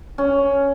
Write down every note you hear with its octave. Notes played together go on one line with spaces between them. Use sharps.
C#4